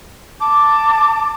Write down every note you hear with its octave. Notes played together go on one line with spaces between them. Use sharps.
A5 D6